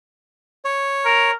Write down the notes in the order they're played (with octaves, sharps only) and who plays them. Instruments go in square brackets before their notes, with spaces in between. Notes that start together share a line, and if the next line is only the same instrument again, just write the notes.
[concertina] C#5
[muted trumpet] A#4